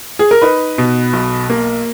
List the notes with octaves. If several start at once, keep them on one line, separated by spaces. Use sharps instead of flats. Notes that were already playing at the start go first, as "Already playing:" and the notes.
G#4
A#4
D#4 B4
B2
B1
A#3